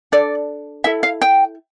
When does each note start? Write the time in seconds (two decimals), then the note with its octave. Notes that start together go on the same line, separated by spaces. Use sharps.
0.12 D4 A4 D5
0.84 E4 A4 E5
1.03 F5
1.21 G5